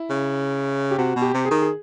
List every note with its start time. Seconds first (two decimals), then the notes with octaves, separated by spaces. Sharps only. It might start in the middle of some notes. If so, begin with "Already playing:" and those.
Already playing: E4
0.10 C#3
0.91 G4
0.98 C3 F#4
1.15 B2
1.21 G4
1.34 C3
1.45 G#4
1.51 D#3
1.62 G#4